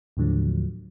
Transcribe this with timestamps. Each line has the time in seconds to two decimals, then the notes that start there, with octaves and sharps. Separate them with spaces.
0.17 D#2 A2 D3 F3 F#3